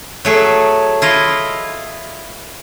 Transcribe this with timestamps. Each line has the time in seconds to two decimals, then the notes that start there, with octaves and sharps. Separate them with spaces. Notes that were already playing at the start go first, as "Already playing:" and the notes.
0.25 F#3 A3 G#4
1.02 E4 F4 D#5